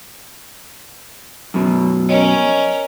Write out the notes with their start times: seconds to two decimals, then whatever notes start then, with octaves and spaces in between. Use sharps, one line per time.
1.54 F#2 B2
2.09 C#4 A#4 C#5 D#5